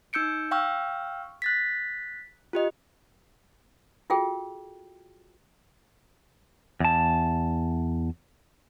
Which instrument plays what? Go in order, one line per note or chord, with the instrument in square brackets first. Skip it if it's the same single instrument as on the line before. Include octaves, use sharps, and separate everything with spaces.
[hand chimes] D#4 E6 G6 C#7 D7
F5 G5 C#6 E6 F6
F#6 A6 B6
F4 G4 D#5
[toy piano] F4 F#4 G#4 A4 G5
[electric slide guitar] E2 A5